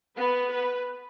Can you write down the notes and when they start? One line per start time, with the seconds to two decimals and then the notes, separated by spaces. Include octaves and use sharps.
0.17 B3 B4
0.49 B4